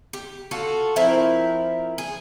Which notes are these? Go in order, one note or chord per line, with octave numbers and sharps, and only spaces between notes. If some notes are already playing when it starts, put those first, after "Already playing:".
G4
F4 F#4 A4
F3 C4 E4 A#4
G#4